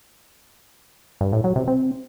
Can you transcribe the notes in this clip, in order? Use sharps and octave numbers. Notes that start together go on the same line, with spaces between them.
G2
A2
F#3
C3
C4